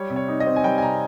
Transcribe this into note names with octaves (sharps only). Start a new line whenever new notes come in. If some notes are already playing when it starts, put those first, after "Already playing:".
Already playing: G3 C#5
C3
C#5
D#4
D#5
C4
G#5
G3 G5
G#5
C3 A#5